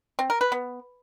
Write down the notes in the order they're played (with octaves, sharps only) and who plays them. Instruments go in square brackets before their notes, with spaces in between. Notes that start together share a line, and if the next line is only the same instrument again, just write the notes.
[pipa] C4
A#4
B4
B3